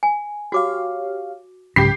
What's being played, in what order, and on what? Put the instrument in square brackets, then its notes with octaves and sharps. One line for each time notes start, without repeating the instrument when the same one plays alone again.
[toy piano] G#5
[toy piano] F#4 D6 [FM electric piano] G4 C#5 F5
[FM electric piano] C2 C#3 B5 [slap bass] G#2 F#3 [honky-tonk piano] G4 C7